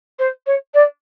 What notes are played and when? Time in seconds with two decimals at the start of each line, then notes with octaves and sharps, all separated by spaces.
0.19 C5
0.47 C#5
0.74 D5